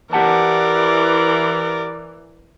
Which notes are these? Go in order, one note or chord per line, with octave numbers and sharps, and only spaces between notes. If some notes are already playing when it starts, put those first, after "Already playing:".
E3 G4 A#4 D5 F#5 A5